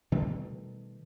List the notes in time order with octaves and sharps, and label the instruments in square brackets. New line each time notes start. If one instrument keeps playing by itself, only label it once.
[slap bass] B2 D#3 G3 A3